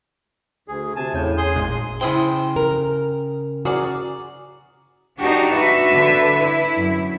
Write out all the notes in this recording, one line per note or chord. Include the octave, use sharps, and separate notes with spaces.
D2 G#4
C3 G#5 A5
E2 A2 C#3 C#5 G6
G#4 C6 D#6
G#1 A#2 G#3
C#3 E4 G#4 C5 G5
A#4
F#4 G#4 A#4 D5
D4 D#4 F#4 G4
F#4 B4 E5
D3
E4
F#2